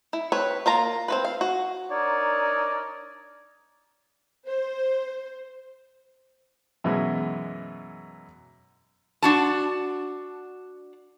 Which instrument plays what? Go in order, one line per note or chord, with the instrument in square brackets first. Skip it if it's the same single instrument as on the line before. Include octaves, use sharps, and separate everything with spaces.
[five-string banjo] E4
C4 B4 C#5
A#3 F4 A#5
C4 F#4 B4
F5
F#4
[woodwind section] D4 D#4 A#4 C#5 D5
[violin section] C5
[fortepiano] F#2 B2 E3 G#3
[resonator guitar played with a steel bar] D4 F#4 A5